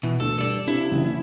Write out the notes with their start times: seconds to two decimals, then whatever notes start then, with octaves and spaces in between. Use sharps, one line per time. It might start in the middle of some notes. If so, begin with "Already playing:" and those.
0.03 B2 E3
0.20 D2 B2 A4
0.39 G2 A4 D5
0.68 C3 G#3 D4 E4 F4
0.91 F#1 C#3 E3